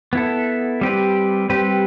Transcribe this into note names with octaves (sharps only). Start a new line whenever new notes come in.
B3 E4 A4
G3 C4 G4 B4
G3 C4 G4 B4